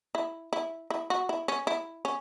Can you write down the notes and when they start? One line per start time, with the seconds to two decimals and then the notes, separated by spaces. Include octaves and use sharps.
0.15 E4
0.53 E4
0.90 E4
1.10 F#4
1.29 E4
1.48 C#4
1.67 E4
2.05 C#4